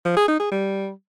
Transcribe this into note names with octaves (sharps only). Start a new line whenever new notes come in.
F3
G#4
D#4
G#4
G3